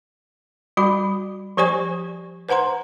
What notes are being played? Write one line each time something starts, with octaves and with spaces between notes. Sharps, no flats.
G3 F#4 B5
F3 G4 C5 D5 G#5 C#6
B4 C5 F#5 A#5 C6